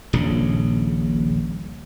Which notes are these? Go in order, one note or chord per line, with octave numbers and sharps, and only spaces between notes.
D#1 A#1 C#3